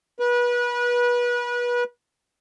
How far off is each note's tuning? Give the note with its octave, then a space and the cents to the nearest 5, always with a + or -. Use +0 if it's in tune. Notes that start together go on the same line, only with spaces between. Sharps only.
B4 -30